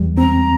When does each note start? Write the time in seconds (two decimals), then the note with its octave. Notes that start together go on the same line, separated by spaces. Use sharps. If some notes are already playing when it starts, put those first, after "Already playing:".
Already playing: E2 G3
0.18 C4 A#5